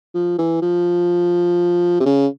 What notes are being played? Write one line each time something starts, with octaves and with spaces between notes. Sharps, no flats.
F3
E3
F3
C3
C#3